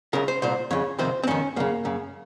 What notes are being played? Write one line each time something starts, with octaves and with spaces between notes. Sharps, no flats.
C#2 C#3 A#4
C5
C2 A#2 C5
F2 C#3 C#5
F2 C3 D#3 C5
C4
F2 D#3 C#4
F#2 C#3 A#3
F#2 C#3